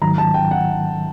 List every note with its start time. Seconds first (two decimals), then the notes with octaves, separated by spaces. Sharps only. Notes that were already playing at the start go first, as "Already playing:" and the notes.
0.02 G#2 D#3 F#3 A#5
0.18 A5
0.34 G5
0.51 F#5